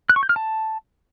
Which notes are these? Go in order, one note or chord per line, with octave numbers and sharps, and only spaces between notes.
F#6
C#6
G6
F6
A5